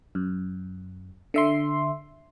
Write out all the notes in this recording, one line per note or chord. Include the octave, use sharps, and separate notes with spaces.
F#2
D3 E5 C6